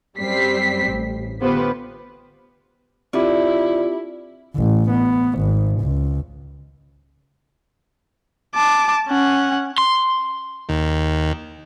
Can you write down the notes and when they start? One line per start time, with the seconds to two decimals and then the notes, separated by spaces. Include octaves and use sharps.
0.17 F#2 G3 C4 B6 C7
0.88 A1
1.41 D3 B3 F4 G4 B4 C5
3.13 D3 C4 E4 F4 G4 D6
4.56 A1
4.90 B3
5.39 G#1
5.81 C#2
8.55 A5 D6
9.08 C#4 F#5
9.78 C6
10.69 D#2